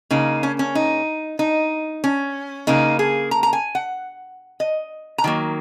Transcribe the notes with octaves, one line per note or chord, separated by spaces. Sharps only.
C#3 A#3 D#4
C#4
C#4
D#4
D#4
C#4
C#3 A#3 D#4
G#4
A#5
A#5
G#5
F#5
D#5
A#5
D#3 F#3 A#3